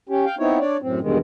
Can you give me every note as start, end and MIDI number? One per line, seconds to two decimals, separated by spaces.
0.09 0.25 61
0.09 0.25 67
0.25 0.35 77
0.25 0.35 79
0.39 0.59 59
0.39 0.59 60
0.39 0.59 63
0.39 0.59 64
0.39 0.59 73
0.60 0.77 62
0.60 0.77 73
0.60 0.77 74
0.82 0.99 42
0.82 0.99 45
0.82 0.99 60
1.01 1.18 40
1.01 1.18 43
1.01 1.18 47
1.01 1.18 51
1.01 1.18 56